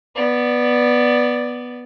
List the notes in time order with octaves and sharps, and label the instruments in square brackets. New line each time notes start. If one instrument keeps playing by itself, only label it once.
[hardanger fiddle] B3 D5